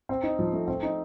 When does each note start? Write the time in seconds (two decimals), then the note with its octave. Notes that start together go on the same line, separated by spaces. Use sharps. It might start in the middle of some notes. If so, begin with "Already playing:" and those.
0.09 C4
0.23 D#4
0.39 F3
0.53 A3
0.68 C4
0.83 D#4